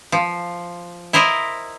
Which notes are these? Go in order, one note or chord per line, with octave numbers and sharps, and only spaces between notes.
F3
E4 A#4 C5 D#5